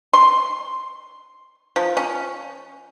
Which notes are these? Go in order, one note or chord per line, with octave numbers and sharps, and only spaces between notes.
C6
F3
C#4